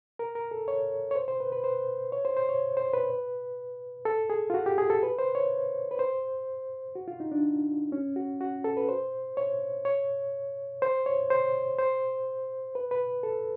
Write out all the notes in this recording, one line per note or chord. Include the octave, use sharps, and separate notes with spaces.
A#4
A#4
A4
C#5
C#5
C5
C5
B4
B4
C5
C#5
C5
C5
C#5
C5
B4
A4
G#4
F4
F#4
G4
G#4
A4
B4
C5
C#5
B4
C5
F#4
F4
D#4
D4
C#4
F#4
F#4
A4
B4
C5
C#5
C#5
C5
C#5
C5
C5
B4
B4
A4